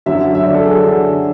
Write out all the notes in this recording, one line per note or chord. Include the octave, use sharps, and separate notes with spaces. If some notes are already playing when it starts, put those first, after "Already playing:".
F#2 D3 F#3 E5
E5
F#2 D3 F#3 D5
A4
G#4
F#2 D3 F#3 F#4